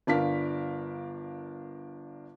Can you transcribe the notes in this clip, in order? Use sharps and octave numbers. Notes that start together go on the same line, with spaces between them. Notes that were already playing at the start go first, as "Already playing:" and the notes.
G1 D4 A#4 F5 B6